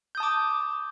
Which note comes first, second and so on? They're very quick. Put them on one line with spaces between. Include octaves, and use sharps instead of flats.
G6 D#6 A5 D6